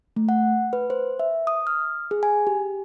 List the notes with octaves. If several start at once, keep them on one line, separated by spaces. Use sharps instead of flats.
A3
F#5
B4
C5
E5
D#6
F6
G#4
G#5
G4